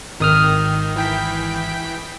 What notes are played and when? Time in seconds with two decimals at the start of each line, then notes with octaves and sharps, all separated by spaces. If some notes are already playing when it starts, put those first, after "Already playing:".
0.20 G#1 D#3 D#6 F6
0.96 E3 G5 B6